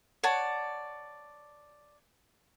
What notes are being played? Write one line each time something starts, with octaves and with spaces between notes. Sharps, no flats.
C#5 D5 F#5 A5